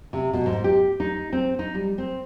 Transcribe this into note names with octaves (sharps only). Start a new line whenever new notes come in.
C3
B2
G#2
G4
D#4
C4
D#4
G3
C4